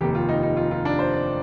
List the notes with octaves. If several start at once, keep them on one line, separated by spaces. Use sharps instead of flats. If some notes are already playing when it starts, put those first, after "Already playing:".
F1 D#2 D#3 G4
F4
D#4
D#4
F4
F4
D4
C5
D5